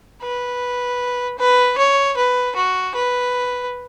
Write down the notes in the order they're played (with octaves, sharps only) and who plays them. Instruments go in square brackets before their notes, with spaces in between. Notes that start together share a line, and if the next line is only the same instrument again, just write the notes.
[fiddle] B4
B4
C#5
B4
F#4
B4